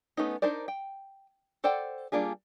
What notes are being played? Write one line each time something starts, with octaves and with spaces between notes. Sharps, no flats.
A3 B3 C#4 D#4
D4 D#4 A#4 C5 D5
G5
A4 C5 D5 F#5 G5
G3 A#3 D4 F4 G#4